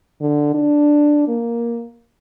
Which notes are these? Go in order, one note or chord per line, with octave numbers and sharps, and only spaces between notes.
D3
D4
A#3